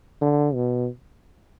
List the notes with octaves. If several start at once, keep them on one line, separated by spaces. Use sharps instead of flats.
D3
B2